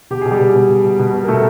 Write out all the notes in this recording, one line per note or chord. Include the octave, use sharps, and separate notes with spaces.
B2 G4
B2 G#4
G3 G4
B2
B2
B2
B2
B2
B2
A#4
B2 A3 A4